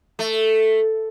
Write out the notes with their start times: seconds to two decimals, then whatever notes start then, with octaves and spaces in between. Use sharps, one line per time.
0.19 A3